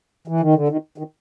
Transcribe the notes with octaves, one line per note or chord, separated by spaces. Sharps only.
E3
D#3
D3
D#3
D#3